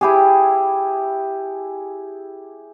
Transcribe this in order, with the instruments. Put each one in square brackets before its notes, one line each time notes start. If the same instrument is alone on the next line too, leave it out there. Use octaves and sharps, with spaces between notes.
[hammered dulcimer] E4 G4 G#4